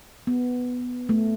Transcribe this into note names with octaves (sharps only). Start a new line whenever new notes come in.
B3
A3